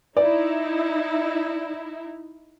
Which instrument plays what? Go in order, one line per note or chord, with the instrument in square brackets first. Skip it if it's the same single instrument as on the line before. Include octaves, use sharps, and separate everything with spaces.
[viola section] D#4 E4 [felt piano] D5